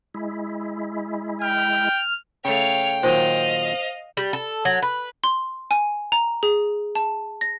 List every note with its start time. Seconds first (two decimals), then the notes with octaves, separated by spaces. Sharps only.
0.14 G#3 E4
1.42 G5 F6
2.45 C#3 A3 C#5 F5 G5
3.03 A#2 D#3 F#3 C5 D#5 F5
4.17 G3
4.33 A4
4.65 F#3
4.82 B4
5.24 C6
5.71 G#5
6.12 A#5
6.43 G#4
6.95 A5
7.41 A#6